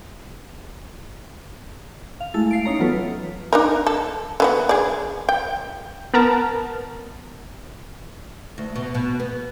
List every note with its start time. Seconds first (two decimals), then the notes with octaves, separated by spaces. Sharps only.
2.20 F5
2.34 G#3 A3 E4 A6
2.51 F5 C7 D7
2.65 C#4 D#4 C#5 A#5
2.79 E3 F#3 B3 F4 A4 B4
3.53 D4 D#4 A#4
3.87 A4
4.40 D3 B3 F#4
4.69 G#4 D5
5.29 G5
6.14 B3 A#4 A5 A#5
8.58 D2
8.76 B2
8.95 B2
9.20 B3